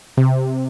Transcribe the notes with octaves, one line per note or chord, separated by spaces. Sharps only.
C3